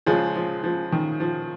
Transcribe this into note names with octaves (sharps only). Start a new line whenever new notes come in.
C#2 C#3 F3 G#3
F3
F3
D#3
F3